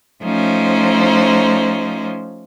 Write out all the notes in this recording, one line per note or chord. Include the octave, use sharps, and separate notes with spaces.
F3 A3 C#4 D#4 C5